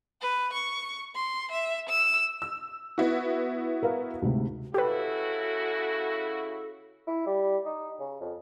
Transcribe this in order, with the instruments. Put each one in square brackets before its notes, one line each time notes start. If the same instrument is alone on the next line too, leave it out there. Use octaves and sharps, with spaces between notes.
[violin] B4
C#6
C6
E5
E6
[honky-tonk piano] E6
B3 E4 F#4
[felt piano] A#4 B4 F5
D2 G#2 C3
[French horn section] C#3 E4 F#4 [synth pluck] G4 B4 [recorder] A4
[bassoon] E4
G3
D#4
C#3
F2